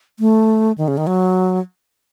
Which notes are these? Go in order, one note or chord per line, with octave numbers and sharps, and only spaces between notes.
A3
D#3
C#3
D#3
F#3